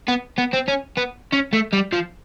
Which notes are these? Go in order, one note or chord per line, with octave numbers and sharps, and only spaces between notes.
B3
B3
C4
C#4
B3
C#4
A3
G3
F3